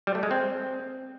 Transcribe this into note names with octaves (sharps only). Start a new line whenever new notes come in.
G3
A3
G#3
C4